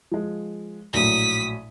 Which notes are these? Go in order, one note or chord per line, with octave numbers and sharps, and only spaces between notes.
F3 G#3
A#1 A2 F#3 D#6 B6